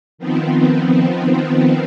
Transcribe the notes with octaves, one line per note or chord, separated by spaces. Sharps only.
D#3 F3 B3 C4